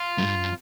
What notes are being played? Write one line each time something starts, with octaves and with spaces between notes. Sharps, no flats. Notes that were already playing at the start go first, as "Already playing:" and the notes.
Already playing: F4
F#2
G2
F#2